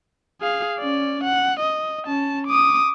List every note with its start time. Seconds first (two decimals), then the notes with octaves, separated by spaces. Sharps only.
0.41 G#4 F5
0.79 C#4 D5
1.24 F#5
1.60 D#5
2.07 C#4 A5
2.47 D6 D#6